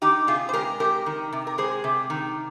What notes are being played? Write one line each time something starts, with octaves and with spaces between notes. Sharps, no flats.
D#3 D#4 G4
C3 F4 G#4
C5
G#3 G4 A#4
C3 G4 A#4
D#3
C3
A#4
G#3 G#4 C5
C3
D#3